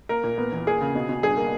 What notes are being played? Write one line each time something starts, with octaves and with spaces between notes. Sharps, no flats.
A#3 A#4
A#2
B3
E2
A#3 G#4
C#3
B2
B2
G2 G#4
A#3